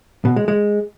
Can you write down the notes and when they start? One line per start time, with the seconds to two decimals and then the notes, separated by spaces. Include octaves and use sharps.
0.25 B2
0.36 G#3
0.48 G#3